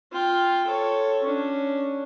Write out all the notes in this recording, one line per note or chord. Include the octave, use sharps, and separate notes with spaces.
F4 G5
A4 C#5
C#4 D4